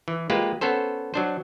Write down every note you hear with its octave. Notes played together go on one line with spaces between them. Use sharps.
E3
G#3 A#3 F4 G4 B4
B3 C#4 A4 C5
F#3 D4 C5